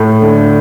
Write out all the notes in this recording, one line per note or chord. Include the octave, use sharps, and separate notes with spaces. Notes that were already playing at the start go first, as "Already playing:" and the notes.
Already playing: A2
D3